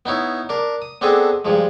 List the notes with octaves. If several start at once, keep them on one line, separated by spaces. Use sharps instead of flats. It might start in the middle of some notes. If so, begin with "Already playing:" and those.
B3 D#4 E4 C#5
D4 A#4
D#6
B3 C4 D4 G#4 A4 D#5
G2 F3 G#3